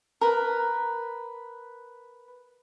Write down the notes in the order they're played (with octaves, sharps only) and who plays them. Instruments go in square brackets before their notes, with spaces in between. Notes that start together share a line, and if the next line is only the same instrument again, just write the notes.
[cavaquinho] A#4 B4